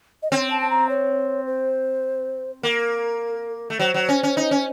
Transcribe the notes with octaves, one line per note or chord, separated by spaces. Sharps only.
D#5
C4 C#5
A5
A5
A#5
C#5
C5
A#3 A#4
A3
F#3 C5
F#3
C#4
C#4
D#4
C#4